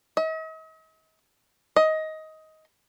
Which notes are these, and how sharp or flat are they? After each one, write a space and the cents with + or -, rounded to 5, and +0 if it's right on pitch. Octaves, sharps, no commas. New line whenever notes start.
D#5 +45
D#5 +15